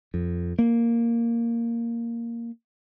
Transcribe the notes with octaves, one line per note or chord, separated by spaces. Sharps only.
F2
A#3